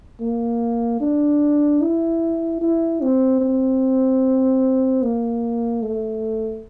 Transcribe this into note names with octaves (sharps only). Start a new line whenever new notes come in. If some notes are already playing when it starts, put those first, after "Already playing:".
A#3
D4
E4
E4
C4
C4
A#3
A3